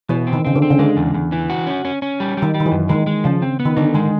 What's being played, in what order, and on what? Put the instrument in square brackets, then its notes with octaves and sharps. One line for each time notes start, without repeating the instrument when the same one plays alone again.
[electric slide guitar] B2 [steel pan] E3
[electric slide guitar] C4
[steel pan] D#3
[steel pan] C#3 [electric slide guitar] C4
[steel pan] D3
[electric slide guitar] C4
[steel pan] C#3
[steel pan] D3 [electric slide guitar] G#3
[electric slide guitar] E2
E2
E3
F#4
C#4
C#4
C#4
G3
G3
[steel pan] D#3
[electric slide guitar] G3
[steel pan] D#3
E3
[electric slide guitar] F#2
[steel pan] D#3 [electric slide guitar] G#3
[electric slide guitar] G#3
[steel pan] C#3 [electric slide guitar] F3
[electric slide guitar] C4
B3
[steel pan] D#3
[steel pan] D3 [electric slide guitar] D#4
[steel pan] D#3 [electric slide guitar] G#3